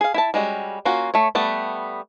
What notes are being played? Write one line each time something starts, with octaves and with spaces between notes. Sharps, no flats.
G#4 F5
E4 G#5 A5
G3 G#3 C#4 F#4
A#3 C#4 F4 F#4
A3 C#5
G3 A3 B3 A5